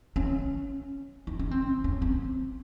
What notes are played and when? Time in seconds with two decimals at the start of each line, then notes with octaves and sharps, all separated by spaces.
0.16 C#4
1.27 D#4
1.39 C#4
1.51 C4
1.84 C#4
2.02 C4